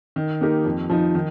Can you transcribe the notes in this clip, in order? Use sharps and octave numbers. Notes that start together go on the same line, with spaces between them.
D#3
A#3 D#4 G4 A#4
F2
F3 D#4
D#3